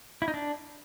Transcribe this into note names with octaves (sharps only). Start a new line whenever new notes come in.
E4
D#4
D4